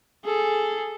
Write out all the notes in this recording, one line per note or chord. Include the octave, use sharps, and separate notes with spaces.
G#4 A4